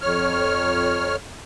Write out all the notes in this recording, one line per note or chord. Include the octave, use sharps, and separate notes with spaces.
F2 C#5 F6